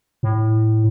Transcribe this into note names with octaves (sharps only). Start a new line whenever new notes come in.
A2